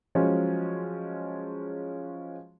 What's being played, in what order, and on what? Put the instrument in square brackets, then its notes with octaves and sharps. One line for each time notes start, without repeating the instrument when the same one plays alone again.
[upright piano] F3 F#3 G#3 C#4